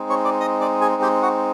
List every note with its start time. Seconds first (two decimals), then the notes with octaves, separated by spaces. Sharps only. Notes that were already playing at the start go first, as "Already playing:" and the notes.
Already playing: G#3 C4 D#4
0.10 C#5 C#6
0.25 D5 D6
0.40 D#5 D#6
0.61 D5 D6
0.81 G#4 G#5
1.02 G4 G5
1.23 F#4 F#5